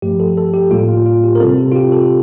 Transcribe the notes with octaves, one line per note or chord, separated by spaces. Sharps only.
G2 F3 A3 G4
A4
A4
G4
A2 G3 A#3 F4
F4
F4
G4
A#4
C3 G3 C4 A4
G4
F4
G4
A4